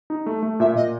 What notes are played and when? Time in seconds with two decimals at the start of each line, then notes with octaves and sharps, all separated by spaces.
0.10 D#4
0.26 A3
0.43 A3
0.60 A#2 E5
0.75 A#2 D#5